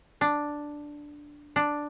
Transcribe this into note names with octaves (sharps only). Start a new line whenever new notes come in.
D4
D4